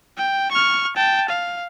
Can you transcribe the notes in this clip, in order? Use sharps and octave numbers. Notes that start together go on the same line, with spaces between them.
G5
C#6 F6
G5 A5
F5